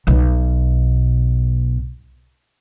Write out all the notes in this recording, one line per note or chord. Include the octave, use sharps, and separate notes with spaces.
B1 B2